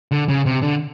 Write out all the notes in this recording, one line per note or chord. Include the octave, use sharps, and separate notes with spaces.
D3
C#3
C3
D3